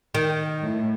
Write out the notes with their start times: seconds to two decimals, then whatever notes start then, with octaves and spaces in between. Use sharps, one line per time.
0.14 D#3
0.62 A2